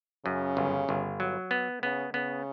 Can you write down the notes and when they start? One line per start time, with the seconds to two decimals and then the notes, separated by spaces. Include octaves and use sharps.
0.25 F#2 C#3
0.57 G1
0.89 G1
1.20 F#3
1.51 B3
1.82 C#3 B3
2.14 C#3 B3